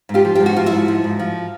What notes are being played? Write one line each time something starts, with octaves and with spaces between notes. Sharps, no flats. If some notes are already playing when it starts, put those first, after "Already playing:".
G#2
F4 G4
F3
G#2 G4
F#4
F3 F4
E4 F#4
G#2
F3
G#2
F3